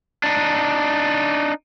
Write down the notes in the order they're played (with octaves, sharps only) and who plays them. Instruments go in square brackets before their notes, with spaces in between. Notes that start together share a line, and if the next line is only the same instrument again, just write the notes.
[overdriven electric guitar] D4 D#4